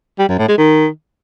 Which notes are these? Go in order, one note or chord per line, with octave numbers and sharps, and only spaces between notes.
G3
F#2
A2
G#3
D#3